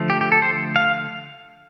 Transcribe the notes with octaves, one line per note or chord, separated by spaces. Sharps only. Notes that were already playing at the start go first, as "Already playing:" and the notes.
Already playing: D3 F3 A3
G4
G4
A4
C5
F5